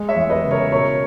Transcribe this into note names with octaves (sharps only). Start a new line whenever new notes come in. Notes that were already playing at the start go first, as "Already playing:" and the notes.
Already playing: G#3
C#5 E5
E2
B4 D#5
C#3
A#4 C#5
B2 A#4 C#5